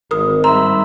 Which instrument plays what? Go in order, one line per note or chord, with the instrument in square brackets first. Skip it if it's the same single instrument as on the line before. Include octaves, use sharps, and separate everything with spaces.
[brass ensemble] G#1 [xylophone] A#4 D#6
[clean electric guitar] G2 D#4 C5 [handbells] E5 B5 E6 [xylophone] A#5